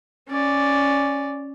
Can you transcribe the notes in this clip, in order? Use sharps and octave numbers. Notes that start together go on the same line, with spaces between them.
C#4 D5